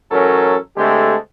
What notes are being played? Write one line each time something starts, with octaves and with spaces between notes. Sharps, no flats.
A1 F#3 C#4 A4 A#4
D3 G#3 A3 C4 G4 A4